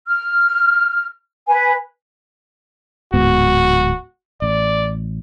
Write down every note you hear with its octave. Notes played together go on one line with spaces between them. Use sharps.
F6
B4 G#5
D1 G#2 B3 F#4
A1 D5